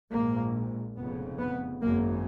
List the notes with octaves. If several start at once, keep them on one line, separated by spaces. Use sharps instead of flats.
A#1 G#2 A#3
F1 F2 C#3 B3
B3
G#1 F#2 C#3 A#3